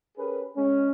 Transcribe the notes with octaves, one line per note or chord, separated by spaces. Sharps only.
C#4 G4 G#4 A#4 B4
G#3 C#4